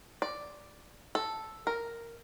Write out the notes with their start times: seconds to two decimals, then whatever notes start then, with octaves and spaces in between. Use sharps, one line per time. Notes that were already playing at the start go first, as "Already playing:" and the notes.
0.22 D5
1.15 A4
1.67 A#4